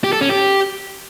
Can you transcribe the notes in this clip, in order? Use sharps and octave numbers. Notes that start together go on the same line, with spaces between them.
G4
A4
C#4
G4